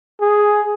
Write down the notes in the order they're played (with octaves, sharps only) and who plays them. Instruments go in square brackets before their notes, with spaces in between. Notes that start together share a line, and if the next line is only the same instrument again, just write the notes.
[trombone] G#4